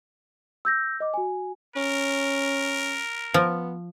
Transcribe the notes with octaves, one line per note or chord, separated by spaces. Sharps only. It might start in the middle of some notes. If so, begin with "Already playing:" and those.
E6 G6 A#6
D#5 D6
F#4 G#5
C#4 A#4
F3 B3